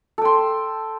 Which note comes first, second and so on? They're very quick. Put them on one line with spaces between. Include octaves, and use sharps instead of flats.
A4 G5 C6